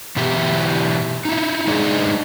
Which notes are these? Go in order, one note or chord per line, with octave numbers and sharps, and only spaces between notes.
B2 E3 E4 G4
D#4 E4
G#3 D4 D#4 G#4 D5 D#5